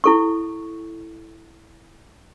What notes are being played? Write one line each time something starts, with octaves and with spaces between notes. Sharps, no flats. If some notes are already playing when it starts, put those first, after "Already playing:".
E4 A4 C#6